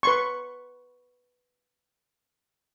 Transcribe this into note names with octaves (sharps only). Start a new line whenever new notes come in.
B4 C6 C#6